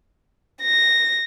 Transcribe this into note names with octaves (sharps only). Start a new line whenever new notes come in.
A#6